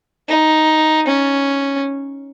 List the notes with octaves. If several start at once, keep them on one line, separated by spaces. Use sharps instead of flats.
D#4
C#4